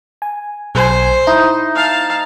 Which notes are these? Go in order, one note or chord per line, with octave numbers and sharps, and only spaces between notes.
G#5
B1 C5 G#5
D#4 E4
F5 A5